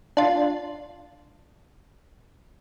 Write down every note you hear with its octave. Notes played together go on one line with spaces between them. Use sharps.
D4 F4